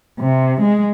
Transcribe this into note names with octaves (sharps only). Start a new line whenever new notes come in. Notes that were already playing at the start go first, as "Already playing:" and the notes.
C3
G#3